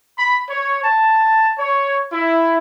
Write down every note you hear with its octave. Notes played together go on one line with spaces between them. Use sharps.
B5
C#5
A5
C#5
E4